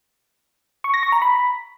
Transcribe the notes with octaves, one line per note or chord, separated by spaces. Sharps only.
C#6
A#6
C#6
A#5
B5